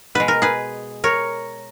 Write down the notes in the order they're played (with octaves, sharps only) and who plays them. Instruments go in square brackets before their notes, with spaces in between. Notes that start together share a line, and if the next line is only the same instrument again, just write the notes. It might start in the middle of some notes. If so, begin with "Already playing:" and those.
[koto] B2 G#3 B4
A#4
G#4 B4
A#4 C#5